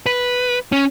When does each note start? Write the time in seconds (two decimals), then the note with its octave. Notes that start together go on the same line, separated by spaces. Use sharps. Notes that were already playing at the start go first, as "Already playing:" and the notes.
0.06 B4
0.72 C#4